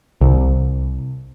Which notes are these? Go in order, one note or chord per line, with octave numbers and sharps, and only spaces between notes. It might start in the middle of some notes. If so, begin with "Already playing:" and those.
C2